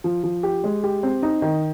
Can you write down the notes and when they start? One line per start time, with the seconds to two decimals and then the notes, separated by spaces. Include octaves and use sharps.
0.04 F3
0.24 F3
0.43 G4
0.64 G#3
0.84 G4
1.03 C4
1.23 D#4
1.42 D#3